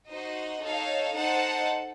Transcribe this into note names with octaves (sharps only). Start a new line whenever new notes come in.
D#4 F#4 C5 D#5
D#4 A4 C#5 F5
D#4 A4 C5 F#5 A5